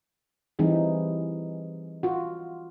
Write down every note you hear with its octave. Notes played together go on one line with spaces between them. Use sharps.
E3 G3 C4 D#4 G#4
F4 F#4